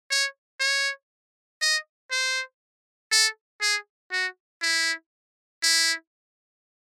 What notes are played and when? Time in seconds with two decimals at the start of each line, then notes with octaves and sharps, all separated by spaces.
0.11 C#5
0.60 C#5
1.62 D#5
2.11 C5
3.12 A4
3.61 G#4
4.12 F#4
4.62 E4
5.63 E4